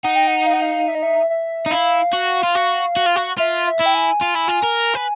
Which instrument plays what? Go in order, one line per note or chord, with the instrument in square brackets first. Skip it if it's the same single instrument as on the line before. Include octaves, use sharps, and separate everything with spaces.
[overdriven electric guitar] D#4 [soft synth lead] F#5
[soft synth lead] G5
F#5
F5
F#5
F5
E5
D#5
E5
E5
[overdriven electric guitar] D#4
[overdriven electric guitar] E4 [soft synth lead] F5
[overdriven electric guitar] F#4
F4
F#4
F#4
F4
F#4
[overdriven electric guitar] F4 [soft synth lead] E5
[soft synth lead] E5
[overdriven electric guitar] E4
[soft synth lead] G5
G#5
[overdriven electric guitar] F4
E4
F4
A#4
B4